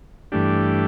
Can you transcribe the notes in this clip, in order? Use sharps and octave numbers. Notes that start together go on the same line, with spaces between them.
G2 E3 A3 D4 G4